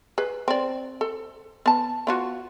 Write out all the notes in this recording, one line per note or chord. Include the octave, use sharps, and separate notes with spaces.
G#4 B4
C4 D5
A4
B3 A5
B3 F4 F#4